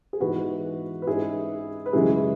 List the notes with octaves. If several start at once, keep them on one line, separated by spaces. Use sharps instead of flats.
G#4
G#2 E3 B3 F#4 B4
B4
G#2 G#3 C#4 E4 G#4
B4
F#2 C#3 E3 G#3 E4 G#4